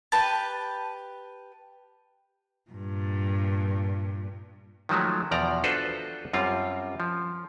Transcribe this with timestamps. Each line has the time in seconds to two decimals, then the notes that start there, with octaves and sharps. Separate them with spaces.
0.12 G4 B4 A5
2.71 G2 A#2
4.89 D#3 F3 F#3 G#3 A3
5.31 E2 B2 F3 D5 A#5
5.64 D4 F4 F#4 A4 B4 C5
6.33 F#2 G3 C4 F4
7.00 F3